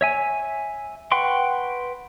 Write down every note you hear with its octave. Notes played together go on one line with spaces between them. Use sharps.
C#5 E5 G#5
B4 F#5 G5 C6 C#6